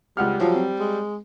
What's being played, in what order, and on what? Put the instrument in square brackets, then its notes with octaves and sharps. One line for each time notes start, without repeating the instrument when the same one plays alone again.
[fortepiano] C#2 F#5 F6 [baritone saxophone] G3
[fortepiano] F3 [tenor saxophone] F#3
[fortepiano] C4
[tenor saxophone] G#3